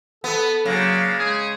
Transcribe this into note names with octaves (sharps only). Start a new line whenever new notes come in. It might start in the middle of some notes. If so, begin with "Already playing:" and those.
B3 A4
C#3 F#3 A#3 D4
G#3 G#4